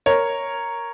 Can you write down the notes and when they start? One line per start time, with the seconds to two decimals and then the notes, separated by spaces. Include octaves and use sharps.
0.06 A#4 C#5